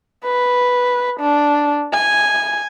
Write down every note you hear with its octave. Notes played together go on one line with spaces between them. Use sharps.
B4
D4
G#5